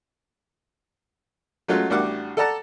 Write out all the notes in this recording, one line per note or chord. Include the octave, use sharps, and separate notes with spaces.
F#3 G#3 A3 C#4 F4 F#4
A1 G3 D4 F#4 F#5 D6
A4 D5 F#5 A5 A#5